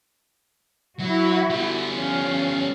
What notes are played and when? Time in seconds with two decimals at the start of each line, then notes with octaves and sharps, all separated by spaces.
0.99 F#3 E4 F#4
1.50 G3 B3
1.92 F3 C#4 F5